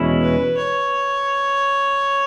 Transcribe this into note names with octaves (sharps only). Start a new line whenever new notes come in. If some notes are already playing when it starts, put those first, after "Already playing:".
Already playing: E2 B2 G#3 C#4 E4
B4
C#5